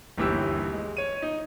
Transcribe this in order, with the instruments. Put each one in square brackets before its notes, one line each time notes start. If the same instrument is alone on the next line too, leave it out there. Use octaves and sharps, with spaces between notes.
[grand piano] G1 D#2 E3 G4 E6
G#3
C#5 D#7
D#4